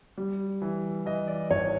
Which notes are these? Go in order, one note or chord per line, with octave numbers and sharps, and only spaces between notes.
G3
E3
E3 D#5
D5
G#1 C#5